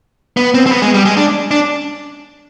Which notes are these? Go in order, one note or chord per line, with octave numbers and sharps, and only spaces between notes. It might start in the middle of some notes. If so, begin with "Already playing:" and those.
B3
C4
C4
B3
G#3
G3
G#3
D4
D4